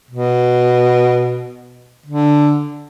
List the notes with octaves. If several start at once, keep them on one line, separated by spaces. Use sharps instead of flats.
B2
D3